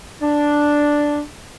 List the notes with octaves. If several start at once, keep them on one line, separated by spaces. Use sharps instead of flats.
D4